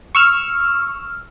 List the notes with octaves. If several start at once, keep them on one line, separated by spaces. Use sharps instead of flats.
C#6 E6 F6